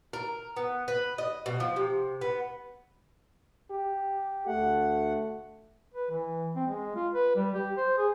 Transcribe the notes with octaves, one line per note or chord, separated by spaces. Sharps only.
A#4
B3
B4
D#5
B2
F3
C3
B3
G4
D2 A3 F#5
B4
E3
C4
G#3
F4
B4
G3
G4
C5
G#4